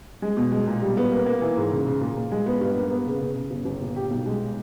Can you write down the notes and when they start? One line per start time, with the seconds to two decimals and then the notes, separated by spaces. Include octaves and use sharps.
0.22 G#3
0.37 B2
0.52 G#3
0.67 A#2
0.82 G3
0.97 B3
1.12 A#3
1.26 A#3
1.42 E3
1.57 G#2
1.72 C#3
1.87 C#3
2.01 A#2
2.17 A#2
2.32 G#3
2.46 B3
2.61 G2
2.76 A#3
2.91 B3
3.06 C#3
3.21 C#3
3.36 C#3
3.51 G1
3.65 G1
3.81 A#2
3.96 G4
4.11 B1
4.26 G#3